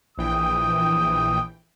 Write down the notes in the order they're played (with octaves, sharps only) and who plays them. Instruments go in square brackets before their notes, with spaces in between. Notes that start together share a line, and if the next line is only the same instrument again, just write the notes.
[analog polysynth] A#1 E3 G5 [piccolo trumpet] D#6